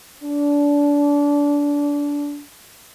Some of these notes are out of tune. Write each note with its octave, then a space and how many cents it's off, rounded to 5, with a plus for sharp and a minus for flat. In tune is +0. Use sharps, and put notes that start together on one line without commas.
D4 -25